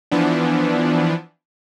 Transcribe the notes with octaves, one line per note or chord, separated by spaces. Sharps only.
E3 F3 B3 D4